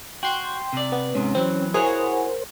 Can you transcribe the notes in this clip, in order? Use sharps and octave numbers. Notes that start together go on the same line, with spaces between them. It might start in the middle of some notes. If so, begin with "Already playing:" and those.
F#4 G5 C6 G6
C3 D5
B3
G#2 C3 C#4
E3 F#3 C4
E4 F#4 G#4 A#4 C5 C#5 F#5